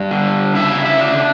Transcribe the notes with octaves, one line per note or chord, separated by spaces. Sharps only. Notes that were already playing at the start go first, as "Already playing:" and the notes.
Already playing: G2
D3
C#3 E4 E5
E4 E5
D4